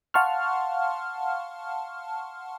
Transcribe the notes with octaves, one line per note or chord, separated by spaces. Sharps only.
F5 F#5 A5 C6 C#6 F6